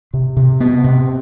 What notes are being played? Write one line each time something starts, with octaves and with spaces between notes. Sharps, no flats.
C3
C3
B3
C3